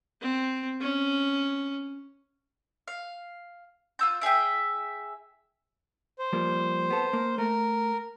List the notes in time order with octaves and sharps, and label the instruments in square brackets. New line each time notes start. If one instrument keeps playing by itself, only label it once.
[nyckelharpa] C4
C#4
[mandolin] F5
F4 E6 G6
E4 G#4 E5 G5
[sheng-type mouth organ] C5
[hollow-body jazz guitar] F3 G3 A#3
B3 A4
A#3
[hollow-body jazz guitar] A3 [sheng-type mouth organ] A#4